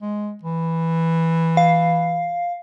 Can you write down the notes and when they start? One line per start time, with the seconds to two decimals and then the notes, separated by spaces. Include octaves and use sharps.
0.01 G#3
0.43 E3
1.57 F5